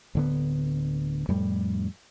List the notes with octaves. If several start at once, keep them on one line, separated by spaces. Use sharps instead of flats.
D1 D3 B3
F2 A2 G3